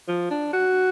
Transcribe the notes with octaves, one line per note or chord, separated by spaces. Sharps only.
F3
D4
F#4